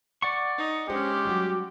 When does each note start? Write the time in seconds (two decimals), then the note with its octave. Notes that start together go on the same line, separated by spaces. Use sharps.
0.22 D5 F#5 C#6
0.58 D#4
0.89 G#3 C#4 D4 G4 G#4 C5
1.25 F#3 G3 F#4